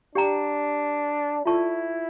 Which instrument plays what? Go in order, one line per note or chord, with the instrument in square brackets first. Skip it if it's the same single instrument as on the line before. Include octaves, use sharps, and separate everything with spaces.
[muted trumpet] D4 [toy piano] G4 D5 G5 A#5
[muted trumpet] E4 [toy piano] F4 A4 D5 A5 C#6